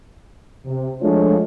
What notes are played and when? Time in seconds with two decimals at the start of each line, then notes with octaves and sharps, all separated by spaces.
0.66 C3
1.02 F3 G#3 A3 D4 F4 C#5